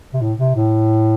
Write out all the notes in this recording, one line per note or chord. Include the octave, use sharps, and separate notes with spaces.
C3
A2
C3
A2